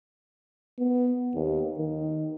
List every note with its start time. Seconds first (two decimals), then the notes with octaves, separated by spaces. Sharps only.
0.78 B3
1.34 D#2
1.78 D#3